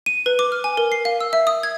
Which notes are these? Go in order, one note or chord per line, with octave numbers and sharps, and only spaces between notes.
D#7
B4
D6
F6
G#5
A#4
C7
F5
E6
E5
D#6
G#6